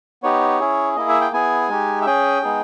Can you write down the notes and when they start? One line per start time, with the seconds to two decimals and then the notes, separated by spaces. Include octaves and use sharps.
0.23 B3 D#4 G4 C#5
0.60 C#4 E4 G#4
0.96 A#3 E4 G#4 D#5
1.09 E5
1.21 G5
1.33 B3 E4 G#4 G#5
1.69 G#3 D#4 G4
2.02 E5
2.06 C#4 G#4 G5
2.42 G#3 B3 D#4 G#4